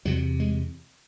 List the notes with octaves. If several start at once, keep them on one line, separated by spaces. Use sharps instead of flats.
E2 C3 F#3
G#3